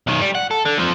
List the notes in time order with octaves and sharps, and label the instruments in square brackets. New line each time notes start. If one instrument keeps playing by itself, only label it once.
[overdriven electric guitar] B1 D#3
G3
F#5
A4
D3
F3 C4